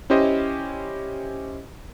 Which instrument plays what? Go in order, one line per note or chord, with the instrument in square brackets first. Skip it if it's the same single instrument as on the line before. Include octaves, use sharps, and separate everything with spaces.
[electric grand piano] C#4 E4 G4 C5 D#5